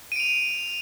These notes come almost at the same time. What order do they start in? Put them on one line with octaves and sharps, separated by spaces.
D#7 D7 F7